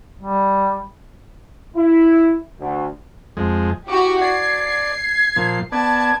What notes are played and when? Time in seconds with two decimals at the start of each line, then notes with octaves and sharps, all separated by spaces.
0.21 G3
1.76 E4
2.59 D2
3.37 F2 G#3
3.88 E4 F#4 G4 C#6 D6
4.21 D5 G#6 C7
4.67 G#6
5.36 A#2 F3
5.72 B3 D5 A5 G#6